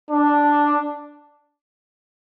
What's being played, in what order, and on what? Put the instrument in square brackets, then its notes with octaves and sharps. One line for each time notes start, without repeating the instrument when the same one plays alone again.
[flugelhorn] D4